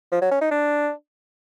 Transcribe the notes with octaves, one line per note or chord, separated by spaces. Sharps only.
F3
F#3
C#4
D#4
D4